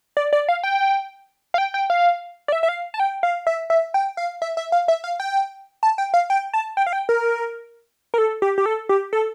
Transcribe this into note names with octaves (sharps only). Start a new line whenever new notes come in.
D5
D5
F5
G5
F5
G5
G5
F5
D5
E5
E5
F5
A5
G5
F5
E5
E5
G5
F5
E5
E5
F5
E5
F5
G5
A5
G5
F5
G5
A5
G5
F5
G5
A#4
A#4
A4
G4
G4
A4
G4
A4